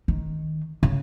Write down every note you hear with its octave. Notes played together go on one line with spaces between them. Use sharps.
D#3
C#3